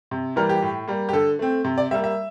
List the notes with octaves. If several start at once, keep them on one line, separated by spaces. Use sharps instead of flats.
C3
E3 G3 A#3 A#4
G4
A2
G3 A#3
G4
D3 A4
A3 C4
C3
D5
G3 A#3 E5
E5